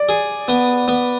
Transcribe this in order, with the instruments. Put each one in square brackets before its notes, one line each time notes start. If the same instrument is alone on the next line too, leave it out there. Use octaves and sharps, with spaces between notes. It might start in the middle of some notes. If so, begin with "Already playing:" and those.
Already playing: [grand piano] D5
[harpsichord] G#4
B3
B3